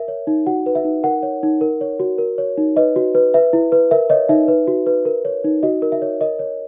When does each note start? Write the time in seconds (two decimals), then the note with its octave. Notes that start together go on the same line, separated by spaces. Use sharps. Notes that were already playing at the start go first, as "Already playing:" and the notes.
Already playing: A#4 E5
0.08 C#5
0.27 D#4
0.47 F#4 F#5
0.66 B4
0.75 E5
0.85 D#4
1.04 A#4 F#5
1.23 C#5
1.43 D#4
1.61 A#4
1.81 C#5
2.00 F#4
2.18 A#4
2.38 C#5
2.58 D#4
2.77 B4 D#5
2.96 F#4
3.15 B4
3.34 B4 E5
3.53 E4
3.72 B4
3.91 A#4 E5
4.10 C#5 D#5
4.29 D#4 E5
4.48 B4
4.67 F#4
4.86 B4
5.05 A#4
5.25 C#5
5.44 D#4
5.63 F#4 D#5
5.82 A#4
5.92 E5
6.02 C#5
6.21 A#4 D#5
6.39 C#5